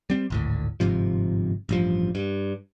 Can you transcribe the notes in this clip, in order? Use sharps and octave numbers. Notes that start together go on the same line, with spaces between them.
G3 C4
G#1 D2 A2
G1 G#2 C3 F3
A1 G2 F3
G2